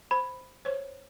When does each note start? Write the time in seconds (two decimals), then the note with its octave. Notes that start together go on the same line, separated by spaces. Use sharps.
0.11 C5 B5
0.65 C5 C#5